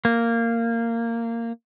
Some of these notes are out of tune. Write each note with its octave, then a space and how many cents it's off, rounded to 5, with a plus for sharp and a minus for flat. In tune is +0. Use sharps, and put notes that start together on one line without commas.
A#3 -15